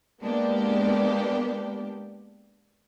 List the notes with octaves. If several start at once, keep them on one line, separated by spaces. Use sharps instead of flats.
G#3 A#3 B3 D4 G4